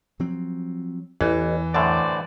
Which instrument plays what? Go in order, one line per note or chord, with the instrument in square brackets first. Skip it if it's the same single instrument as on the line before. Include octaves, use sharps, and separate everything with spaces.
[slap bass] F3 F#3 C4
[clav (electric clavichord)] A1 [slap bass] E2 [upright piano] E3
[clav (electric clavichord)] F#2 A2 D3 [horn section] F#4 C5 D5